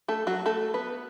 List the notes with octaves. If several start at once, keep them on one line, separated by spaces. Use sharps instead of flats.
A3 A4
F#3 F#4
A3 A4
B3 B4